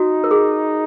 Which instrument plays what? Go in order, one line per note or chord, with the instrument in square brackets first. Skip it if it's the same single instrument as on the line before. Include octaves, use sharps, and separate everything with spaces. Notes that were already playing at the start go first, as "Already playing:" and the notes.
Already playing: [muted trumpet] D#4 [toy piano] F#4
[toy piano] A#4
G#4